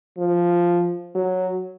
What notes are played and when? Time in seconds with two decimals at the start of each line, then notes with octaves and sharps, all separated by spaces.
0.18 F3
1.15 F#3